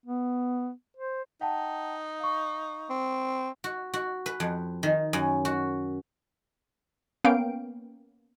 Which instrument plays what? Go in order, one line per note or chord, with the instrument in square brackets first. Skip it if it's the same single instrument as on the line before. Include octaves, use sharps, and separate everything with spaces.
[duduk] B3
C5
[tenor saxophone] D#4 [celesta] F#5 G5 A5
[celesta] F5 C#6
[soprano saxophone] C4
[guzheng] F#4
F#4
B4
F2
D#3
F#2
F#4
[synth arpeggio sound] A#3 B3 C#4 F5 G5 D7